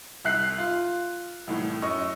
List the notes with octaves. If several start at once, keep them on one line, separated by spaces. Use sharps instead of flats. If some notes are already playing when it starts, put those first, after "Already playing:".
C2 E5 F#6 C7
F4
C2 A2 E3
F#2 D#5 C#6